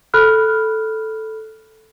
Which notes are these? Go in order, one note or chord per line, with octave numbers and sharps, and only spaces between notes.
A4 B5 F6 F#6